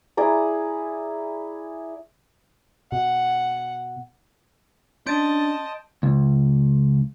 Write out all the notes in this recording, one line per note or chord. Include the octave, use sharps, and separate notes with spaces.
E4 G#4 D5 A#5
B2 F#5
C#4 D4 D#5 A5 C6 G6 A6 D7
C#2